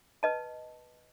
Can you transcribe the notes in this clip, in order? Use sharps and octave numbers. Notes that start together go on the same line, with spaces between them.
B4 D#5 A5